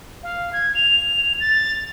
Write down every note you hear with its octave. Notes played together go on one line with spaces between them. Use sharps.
F5
G#6
F7
A6